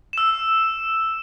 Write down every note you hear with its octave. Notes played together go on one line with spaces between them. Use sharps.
E6 E7